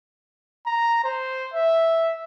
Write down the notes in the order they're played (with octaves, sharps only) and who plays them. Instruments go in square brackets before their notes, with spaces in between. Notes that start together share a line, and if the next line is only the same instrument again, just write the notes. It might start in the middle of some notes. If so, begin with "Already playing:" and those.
[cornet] A#5
C5
E5